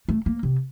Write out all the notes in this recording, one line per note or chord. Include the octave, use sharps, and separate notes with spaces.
A3
A#3
C3